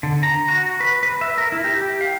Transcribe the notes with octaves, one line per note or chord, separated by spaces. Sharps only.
D3
A#5
F#4
B4
B4
E5
A#4
E4
G4
G4
F5